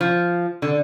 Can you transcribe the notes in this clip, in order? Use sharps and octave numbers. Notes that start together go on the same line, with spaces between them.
F3
D3